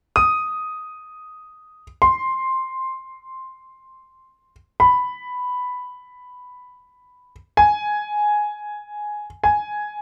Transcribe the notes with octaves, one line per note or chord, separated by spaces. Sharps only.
D#6
C6
B5
G#5
G#5